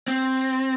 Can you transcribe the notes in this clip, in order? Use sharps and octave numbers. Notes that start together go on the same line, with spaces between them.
C4